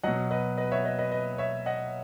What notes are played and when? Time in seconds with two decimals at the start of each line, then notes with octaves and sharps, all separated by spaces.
0.03 B2 F#3 D#5 F#5
0.31 B4 D#5
0.57 B4 D#5
0.71 C#5 E5
0.84 B4 D#5
0.99 B4 D#5
1.11 B4 D#5
1.38 C#5 E5
1.66 D#5 F#5